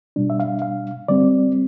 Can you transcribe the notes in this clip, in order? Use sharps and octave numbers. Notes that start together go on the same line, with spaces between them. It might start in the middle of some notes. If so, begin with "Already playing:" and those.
B2 G3 D4
E5
F5
F5
D3 G3 C4 D5